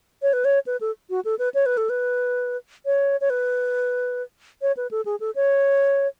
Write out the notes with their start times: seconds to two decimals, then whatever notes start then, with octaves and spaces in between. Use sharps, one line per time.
0.22 C#5
0.33 B4
0.45 C#5
0.66 B4
0.81 A4
1.10 F#4
1.25 A4
1.39 B4
1.54 C#5
1.66 B4
1.77 A4
1.89 B4
2.86 C#5
3.21 C#5
3.30 B4
4.62 C#5
4.77 B4
4.91 A4
5.05 G#4
5.20 A4
5.35 C#5